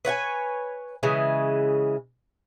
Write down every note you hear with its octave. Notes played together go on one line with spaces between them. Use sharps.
B4 C#5 F#5 G#5
C#3 E3 G#3